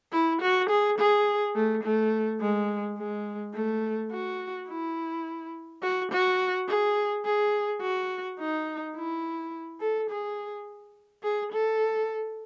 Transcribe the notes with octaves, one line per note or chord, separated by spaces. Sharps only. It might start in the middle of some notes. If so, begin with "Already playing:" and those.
E4
F#4
G#4
G#4
A3
A3
G#3
G#3
A3
F#4
E4
F#4
F#4
G#4
G#4
F#4
D#4
E4
A4
G#4
G#4
A4